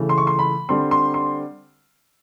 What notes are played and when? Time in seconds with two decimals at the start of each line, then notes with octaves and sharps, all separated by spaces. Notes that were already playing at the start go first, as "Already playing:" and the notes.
Already playing: C#3 E3 A3
0.09 C6
0.18 C#6
0.27 C6
0.39 B5
0.69 D3 G3 C4 C6
0.91 C6
1.14 C6